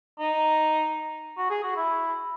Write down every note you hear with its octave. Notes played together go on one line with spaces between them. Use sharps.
D#4
F#4
G#4
F#4
E4